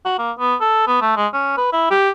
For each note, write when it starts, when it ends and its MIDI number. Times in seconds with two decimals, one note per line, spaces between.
0.06 0.18 66
0.18 0.32 58
0.39 0.55 59
0.61 0.84 69
0.87 0.99 59
1.01 1.16 57
1.17 1.27 56
1.34 1.57 61
1.57 1.68 71
1.73 1.86 64
1.91 2.10 67